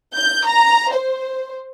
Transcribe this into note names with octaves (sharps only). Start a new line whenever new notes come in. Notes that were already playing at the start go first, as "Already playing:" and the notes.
G6
A#5
C5